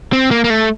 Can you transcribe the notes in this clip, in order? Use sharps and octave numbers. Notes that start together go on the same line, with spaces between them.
C4
A#3
A#3
A3